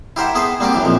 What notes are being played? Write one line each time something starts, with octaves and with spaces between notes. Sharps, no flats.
E4 G4 A#4 C5 E5 F#5
B3 G#4 A4 B4 C5
G3 A#3 C4 F#4 D5
F#2 E3 G4
A#1 F2 F3